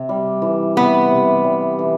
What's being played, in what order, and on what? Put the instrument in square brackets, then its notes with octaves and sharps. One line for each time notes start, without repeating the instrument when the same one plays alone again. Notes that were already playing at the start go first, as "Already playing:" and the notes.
Already playing: [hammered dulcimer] C3
G3
E3
[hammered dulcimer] C3 [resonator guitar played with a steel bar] B3
[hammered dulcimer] C3
G3
E3